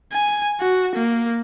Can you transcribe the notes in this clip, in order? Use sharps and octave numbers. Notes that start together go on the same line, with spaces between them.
G#5
F#4
A#3